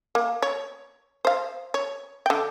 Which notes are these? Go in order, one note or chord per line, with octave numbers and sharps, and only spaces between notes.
A#3
C#5
C5 F5
C#5
D3 G5